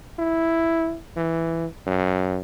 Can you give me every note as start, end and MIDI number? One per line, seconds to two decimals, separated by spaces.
0.19 0.95 64
1.16 1.66 52
1.87 2.41 42